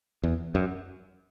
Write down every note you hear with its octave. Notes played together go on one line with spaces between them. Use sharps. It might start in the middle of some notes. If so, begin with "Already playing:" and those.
E2
F#2